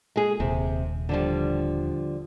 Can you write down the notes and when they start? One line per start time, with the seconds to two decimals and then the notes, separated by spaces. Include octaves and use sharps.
0.16 G#3 G#4
0.40 D#1 C3
1.09 D3 F3 G3